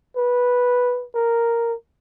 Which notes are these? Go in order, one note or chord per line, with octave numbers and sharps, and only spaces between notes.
B4
A#4